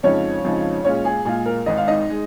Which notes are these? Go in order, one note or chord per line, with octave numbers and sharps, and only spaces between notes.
F2 C#3 F3 G#3 C#4 D#4 C#5
F2 C#3 F3 G#3 D#4
A#2 G#3 C#4 F4 C#5
G#4
A#2 G#3 F4 G#4
A#4
G#1 G#2 G#3 D#5
F5
D#4 D#5
G#3